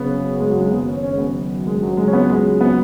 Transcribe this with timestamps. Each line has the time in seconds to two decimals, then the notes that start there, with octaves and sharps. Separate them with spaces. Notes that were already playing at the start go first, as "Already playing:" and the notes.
Already playing: F#1 F#2 C#3 B3
0.40 G#3
0.50 F#3
0.61 G#3
0.72 F#1 F#2 D#3 B3
0.88 C#4
1.03 C#4
1.12 G#3
1.18 B3
1.67 G#3
1.82 F#3
1.97 C#2 C#3 F#3 G#3
2.08 C#4
2.13 B3
2.30 G#3
2.61 B3